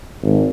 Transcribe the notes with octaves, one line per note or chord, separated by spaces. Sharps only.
G#1